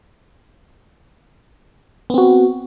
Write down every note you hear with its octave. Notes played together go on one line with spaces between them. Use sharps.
B3 C4 F#4